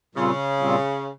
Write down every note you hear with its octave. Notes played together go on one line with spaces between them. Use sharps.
A#2 C#3 G3 C4 F4
A#2 G3 C4 F4